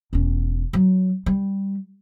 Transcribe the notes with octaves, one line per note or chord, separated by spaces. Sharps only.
E1 C#4
F#3
G3